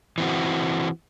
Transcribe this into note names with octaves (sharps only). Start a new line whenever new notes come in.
E3 C4 F#4